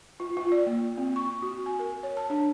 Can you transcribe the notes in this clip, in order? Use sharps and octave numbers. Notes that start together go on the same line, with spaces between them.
F4
F4
D5
A#3
C4
C#6
F#4
G#5
A#4
C#5
A5
D4